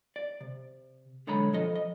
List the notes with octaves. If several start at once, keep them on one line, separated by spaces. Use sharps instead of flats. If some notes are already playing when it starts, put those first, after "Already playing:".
D5
C3
B1 D3 G#3 C#5 A#5 B5
F3 A4 D#5
D#5